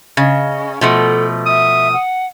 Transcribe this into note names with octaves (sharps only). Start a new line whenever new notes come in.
C#3 D#5
B2 F3 A3 A4
E5 D#6
F#5